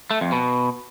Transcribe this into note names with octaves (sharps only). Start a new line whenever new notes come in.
A3
F2
B2